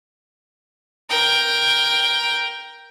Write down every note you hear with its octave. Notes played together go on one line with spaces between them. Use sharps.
A#4 G5